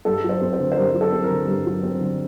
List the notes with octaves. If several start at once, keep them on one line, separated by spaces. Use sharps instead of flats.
G2 A4
F#3
C5
C4
C5
D3
C5
G2 A#4
F#3
A4
C4
A#4
D3
G2 A#4
F#3
C4
D3